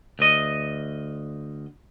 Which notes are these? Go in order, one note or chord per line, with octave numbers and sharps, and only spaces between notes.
D2 D#5